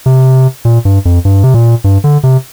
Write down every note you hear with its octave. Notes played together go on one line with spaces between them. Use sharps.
C3
A#2
G2
F2
G2
C3
A#2
G2
D3
C3